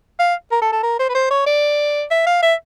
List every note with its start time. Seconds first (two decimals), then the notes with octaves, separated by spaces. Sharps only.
0.19 F5
0.52 A#4
0.62 A4
0.73 A4
0.83 A#4
0.99 C5
1.09 B4
1.14 C5
1.30 C#5
1.46 D5
2.11 E5
2.27 F5
2.42 E5